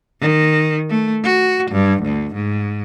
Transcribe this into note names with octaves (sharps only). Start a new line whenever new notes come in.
D#3
A3
F#4
G2
D2
G#2